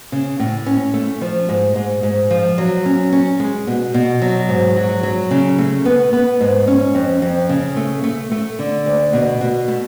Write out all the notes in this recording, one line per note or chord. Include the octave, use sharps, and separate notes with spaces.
C#3
A2
C#4
A3
F3
G#2
G#2
G#2
F3
F#3
C#4
C#4
G#3
B2
B2
F#3
G#2
F#3
F#3
C#3
A3
B3
B3
G#2
C#4
F2
F2
C#3
A3
A3
A3
D3
D2
B2
B2
A3